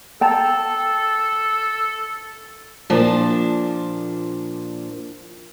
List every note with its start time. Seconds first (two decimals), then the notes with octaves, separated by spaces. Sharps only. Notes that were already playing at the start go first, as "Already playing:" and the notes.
0.21 A4 G5 A5 A#5
2.90 A#2 F3 D4